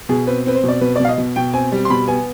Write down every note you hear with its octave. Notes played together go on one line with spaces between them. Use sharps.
B2 G#4
C4 B4
C4 B4
C5
B2
D5
B2 B4
B2 D5
F5
D#5
B2
B2 G5
C4 G#5
G3
C6
B2 B5
B3 G#5